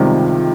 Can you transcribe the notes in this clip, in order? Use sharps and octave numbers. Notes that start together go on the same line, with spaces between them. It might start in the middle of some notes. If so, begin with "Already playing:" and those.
Already playing: C#2 C3 D#3 F3 G3 G#3